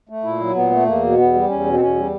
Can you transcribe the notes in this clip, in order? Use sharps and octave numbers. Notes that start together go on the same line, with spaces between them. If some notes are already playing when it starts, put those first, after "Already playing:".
A3
A#2 E4
F#3
A#2 B3
A3
E2 A#3
B2
E2 B3
G3
E2 C#4
B2
C4
E2 C#4
G3